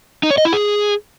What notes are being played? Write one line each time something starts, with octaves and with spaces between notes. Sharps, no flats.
D#4
C#5
D#5
E4
G#4